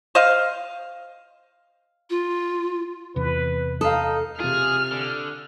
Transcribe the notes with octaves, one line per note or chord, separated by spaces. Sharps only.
C5 D#5 F5
F4
E2 C3 B4
D#4 A4 F5 D#6
C3 F4 G#4 F6
D3